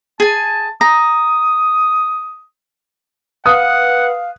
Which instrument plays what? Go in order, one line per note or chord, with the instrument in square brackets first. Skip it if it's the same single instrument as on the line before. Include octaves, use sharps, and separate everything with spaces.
[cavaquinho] G#4 G#5 [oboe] A5
[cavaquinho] A#5 [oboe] D#6
[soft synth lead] B4 [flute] F5 [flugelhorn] F#5 [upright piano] D#6 F#6